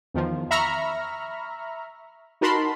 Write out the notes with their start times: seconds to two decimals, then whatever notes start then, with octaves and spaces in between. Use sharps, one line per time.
0.14 E2 D#3 F3
0.51 E5 A#5 B5 C#6 F6
2.41 D#4 F#4 A#4 A5 B5 C6